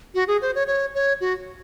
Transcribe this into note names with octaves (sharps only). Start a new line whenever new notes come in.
F#4
G#4
C5
C#5
C#5
C#5
F#4